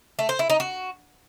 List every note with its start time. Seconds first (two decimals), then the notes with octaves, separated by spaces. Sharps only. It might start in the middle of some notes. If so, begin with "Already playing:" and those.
0.19 A3
0.29 C5
0.39 E4
0.50 D#4
0.60 F#4